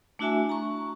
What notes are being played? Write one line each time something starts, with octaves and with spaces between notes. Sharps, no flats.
A3 D4 E4 F#4 E5 G#5
A#5 C#6